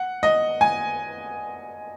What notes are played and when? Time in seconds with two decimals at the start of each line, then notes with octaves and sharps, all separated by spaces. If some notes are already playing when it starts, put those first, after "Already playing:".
Already playing: F#5
0.23 D#5
0.61 G#5